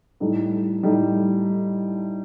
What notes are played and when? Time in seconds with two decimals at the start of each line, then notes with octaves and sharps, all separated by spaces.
0.20 A2 G3 D#4 A4
0.83 A2 G3 D#4 A4